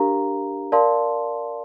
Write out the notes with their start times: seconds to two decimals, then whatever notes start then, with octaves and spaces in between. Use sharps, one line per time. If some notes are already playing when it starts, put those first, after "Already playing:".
Already playing: D4 G4 A#4 F5 A#5
0.72 A#4 D5 F5 A5 C6